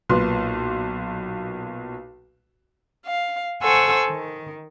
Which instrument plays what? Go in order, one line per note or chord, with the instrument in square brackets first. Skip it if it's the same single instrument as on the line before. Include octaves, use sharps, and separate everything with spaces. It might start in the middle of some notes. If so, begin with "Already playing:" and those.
[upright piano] B1 A#2 B4 C6
[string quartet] F5
A4 C5 F#5 G#5 C#6 E6
D#3